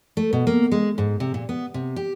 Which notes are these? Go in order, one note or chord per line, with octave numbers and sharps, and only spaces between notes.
A3
B2
A#3
G#3
G#2
C3
A#2
B3
C3
G4